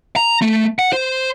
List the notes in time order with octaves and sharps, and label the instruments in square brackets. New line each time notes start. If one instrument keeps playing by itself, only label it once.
[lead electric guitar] A#5
A3
F#5
C5